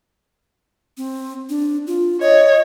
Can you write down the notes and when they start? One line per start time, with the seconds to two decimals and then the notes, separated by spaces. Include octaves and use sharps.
0.97 C4
1.49 D4
1.87 F4
2.21 C#5 D#5